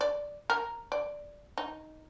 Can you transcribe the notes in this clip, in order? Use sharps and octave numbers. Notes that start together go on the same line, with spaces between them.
D5
A#4
D5
D#4